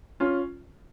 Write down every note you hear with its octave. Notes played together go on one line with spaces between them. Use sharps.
C#4 F4